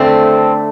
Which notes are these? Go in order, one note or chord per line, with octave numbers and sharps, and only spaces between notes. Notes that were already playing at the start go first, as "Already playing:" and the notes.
Already playing: D3 A3 C4